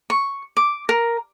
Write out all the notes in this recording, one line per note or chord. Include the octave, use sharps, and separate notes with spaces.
C#6
D6
A#4